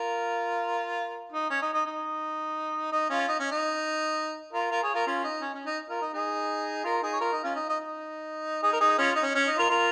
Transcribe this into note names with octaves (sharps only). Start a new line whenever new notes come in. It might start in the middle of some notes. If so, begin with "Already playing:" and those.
Already playing: F4 A#4
D#4
C#4
D#4
D#4
D#4
D#4
C#4 F4
D#4
C#4
D#4
F4 A#4
F4 A#4
G#4 C#5
F4 A#4
C#4 F4
D#4
C#4
C#4
D#4
F4 A#4
D#4
D#4 G#4
F4 A#4
D#4 G#4
C#5
F4 A#4
D#4
C#4 F4
D#4
D#4
D#4
D#4 G#4
A#4
D#4 G#4
C#4 F4
D#4
C#4
C#4
D#4
F4 A#4
F4 A#4